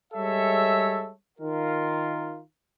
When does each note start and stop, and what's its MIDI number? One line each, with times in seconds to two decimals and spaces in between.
0.13 1.11 55
0.13 1.11 56
0.13 1.11 69
0.13 1.11 73
0.13 1.11 76
1.39 2.40 51
1.39 2.40 65
1.39 2.40 70